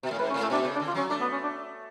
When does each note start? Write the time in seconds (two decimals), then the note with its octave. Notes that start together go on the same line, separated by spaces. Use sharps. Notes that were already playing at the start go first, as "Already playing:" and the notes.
0.03 B2
0.11 A2
0.19 G#2 B4
0.30 C#4
0.34 A2
0.42 A3
0.50 B2 D4
0.65 C#3
0.75 D4
0.80 D3
0.88 F4
0.95 F#3 C#4
1.10 A3 D4
1.21 B3
1.32 C#4
1.44 D4